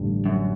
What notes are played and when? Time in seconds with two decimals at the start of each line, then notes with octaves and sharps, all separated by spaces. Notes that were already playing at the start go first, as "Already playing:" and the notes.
Already playing: A1 G2 D3 G3 D4
0.26 F#2